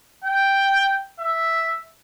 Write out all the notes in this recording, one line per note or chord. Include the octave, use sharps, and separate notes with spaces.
G5
E5